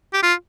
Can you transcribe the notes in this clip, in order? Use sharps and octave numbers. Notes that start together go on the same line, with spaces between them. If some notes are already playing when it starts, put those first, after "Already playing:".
G4
F4